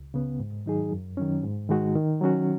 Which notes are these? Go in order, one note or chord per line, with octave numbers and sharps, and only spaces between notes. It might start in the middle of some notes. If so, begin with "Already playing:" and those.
Already playing: C#2
C#3 B3
G#2
D#3 F#3 D#4 G#4
F#2
D#3 F#3 C#4
G#2
D#3 G#3 D#4 F#4
D#3
F#3 C#4 F#4